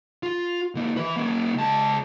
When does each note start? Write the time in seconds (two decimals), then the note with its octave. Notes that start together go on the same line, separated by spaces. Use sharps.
0.23 F4
0.75 D3 A#3
0.97 E3 B4
1.16 A#3 C#4
1.54 C#2 A5